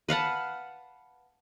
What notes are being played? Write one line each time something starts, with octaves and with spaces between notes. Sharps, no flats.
B4 F5 F#5 A5